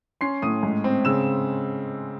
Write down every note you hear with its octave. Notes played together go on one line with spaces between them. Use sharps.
C#4 C6 C7
A2 D#6 D#7
G#2
C4
C#3 E6 E7